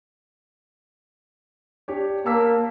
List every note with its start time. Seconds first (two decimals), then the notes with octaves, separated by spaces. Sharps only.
1.88 D4 G4 C#5
2.26 A#3 A5 E6 B6